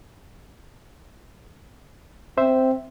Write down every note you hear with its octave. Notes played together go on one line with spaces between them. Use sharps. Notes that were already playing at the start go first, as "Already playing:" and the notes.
C4 C5 E5